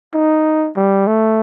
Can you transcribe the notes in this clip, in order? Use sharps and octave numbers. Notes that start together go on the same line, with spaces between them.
D#4
G3
A3